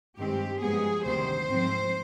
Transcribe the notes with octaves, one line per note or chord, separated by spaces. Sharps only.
G2 D#3 G#3 C4 G4
G2 F3 G#3 B3 G#4
D2 C3 D#3 G3 C5
G#2 F3 C4